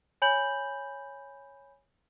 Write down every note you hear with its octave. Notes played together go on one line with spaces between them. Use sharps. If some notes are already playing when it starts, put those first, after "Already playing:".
C#5 G#5 B5 G6 F#7